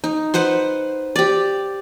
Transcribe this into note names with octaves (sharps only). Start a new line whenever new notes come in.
D#4
B4 C5 F#5 C6
G4 D5